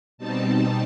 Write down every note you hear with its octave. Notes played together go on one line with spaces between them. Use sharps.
B2 G3 C4 D#4 A5